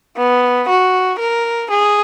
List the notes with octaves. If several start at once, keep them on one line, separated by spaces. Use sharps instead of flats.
B3
F#4
A#4
G#4